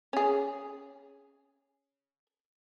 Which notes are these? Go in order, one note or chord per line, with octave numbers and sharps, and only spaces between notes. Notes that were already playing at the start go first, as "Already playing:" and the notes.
C#4 G#4